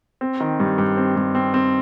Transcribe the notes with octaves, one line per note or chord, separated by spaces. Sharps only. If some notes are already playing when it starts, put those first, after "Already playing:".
C4
D#3
G2
G2
C4
G2
C4
C4